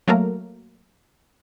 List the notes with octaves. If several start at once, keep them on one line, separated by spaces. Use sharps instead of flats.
F#3 A3 A#3 A#4